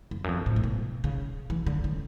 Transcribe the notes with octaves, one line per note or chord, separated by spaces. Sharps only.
F2
F#2
F2
A2
A#2
B2
C#3
E3
D3
C#3